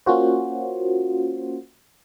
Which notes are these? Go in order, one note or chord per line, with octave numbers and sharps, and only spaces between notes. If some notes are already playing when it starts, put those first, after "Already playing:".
A#3 C#4 F4 F#4 C5